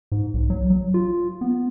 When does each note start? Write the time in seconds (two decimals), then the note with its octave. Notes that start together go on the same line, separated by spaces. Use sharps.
0.12 G#2
0.34 B1
0.50 F#3
0.70 F#3
0.94 F4
1.41 B3